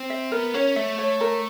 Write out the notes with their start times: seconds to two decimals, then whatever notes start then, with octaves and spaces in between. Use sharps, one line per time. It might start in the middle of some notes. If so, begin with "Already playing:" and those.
Already playing: C4
0.10 E5
0.31 B3 A#4
0.54 C#4 C#5
0.76 A3 E5
0.98 C#5
1.21 A#4